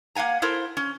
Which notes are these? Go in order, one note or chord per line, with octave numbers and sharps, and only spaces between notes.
A#3 F5 F#5 G#5 A#5
E4 A4 A#4 C5
C#4